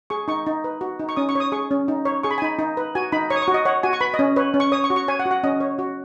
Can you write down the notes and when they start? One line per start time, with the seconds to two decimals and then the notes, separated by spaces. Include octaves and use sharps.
0.10 G#4 C#6
0.28 D#4 C#6
0.46 D#4
0.64 B4
0.81 F#4
0.99 D#4
1.09 C#6
1.16 C#4 D#6
1.29 C#6
1.35 C#5 D#6
1.52 G#4 C#6
1.71 C#4
1.88 D#4
2.05 C#5
2.23 G#4 C#6
2.31 B5
2.38 G#5
2.42 D#4 B5
2.59 D#4
2.77 B4
2.95 F#4 G#5
3.12 D#4 B5
3.30 C#5 C#6
3.36 D#6
3.42 C#6
3.48 F#4
3.54 D#5
3.65 C#5 F#5
3.83 F#4 G#5
3.93 C#6
4.01 B4 B5
4.14 D#5
4.19 C#4
4.36 B4 C#5
4.54 C#4
4.60 C#6
4.72 C#5 D#6
4.84 C#6
4.90 F#4
4.96 C#6
5.08 C#5 G#5
5.19 F#5
5.26 F#4
5.31 F#5
5.44 C#4 D#5
5.61 C#5
5.79 F#4